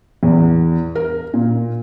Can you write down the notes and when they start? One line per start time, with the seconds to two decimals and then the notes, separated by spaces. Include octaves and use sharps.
0.23 E2
0.95 A#4
1.34 A#2